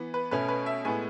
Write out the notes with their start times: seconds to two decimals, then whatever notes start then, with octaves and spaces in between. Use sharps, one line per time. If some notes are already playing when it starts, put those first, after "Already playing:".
Already playing: E3 B3
0.14 B4
0.31 B2 A3 C#4 B4
0.48 B4
0.66 E5
0.85 A2 G#3 B3 G#5